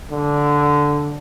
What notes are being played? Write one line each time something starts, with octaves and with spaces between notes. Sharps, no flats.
D3